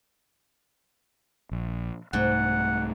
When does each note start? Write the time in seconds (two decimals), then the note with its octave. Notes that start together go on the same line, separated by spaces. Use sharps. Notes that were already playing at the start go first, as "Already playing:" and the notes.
1.51 A#1
2.13 C2 G#2 A3 F#5